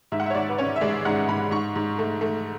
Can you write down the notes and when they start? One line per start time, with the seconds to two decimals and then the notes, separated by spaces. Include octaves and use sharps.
0.12 G#2 E5
0.20 F#5
0.26 E5
0.30 C#5
0.35 G#2 D5
0.49 B4
0.58 C#4 C#5
0.76 E5
0.81 G#3 D5
1.05 G#2 F#5
1.28 G#2 B5
1.51 G#2 C#6
1.76 G#2
1.98 A3
2.21 A3